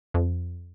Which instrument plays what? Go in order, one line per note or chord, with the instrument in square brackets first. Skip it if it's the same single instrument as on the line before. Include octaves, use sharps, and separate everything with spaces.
[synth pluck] F2